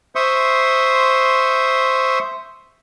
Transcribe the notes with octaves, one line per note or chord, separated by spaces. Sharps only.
C5 E5 C6 C#6 D#6